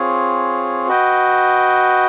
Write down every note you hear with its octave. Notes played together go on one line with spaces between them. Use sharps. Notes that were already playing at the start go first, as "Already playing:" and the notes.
Already playing: C4 F4 G#4 C#5
F#4 B4 D#5 G5